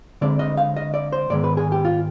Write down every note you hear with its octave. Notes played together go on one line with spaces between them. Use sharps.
D3 G#3 C4 D5
D#5
F5
D#5
D5
C5
G#2 D#3 G#3 B3 D5
B4
G#4
G4
F4